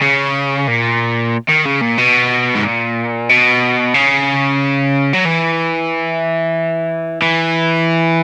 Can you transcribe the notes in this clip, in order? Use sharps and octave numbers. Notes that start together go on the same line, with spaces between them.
C#3
A#2
D#3
C#3
A#2
B2
G#2
A#2
B2
C#3
F#3
E3
E3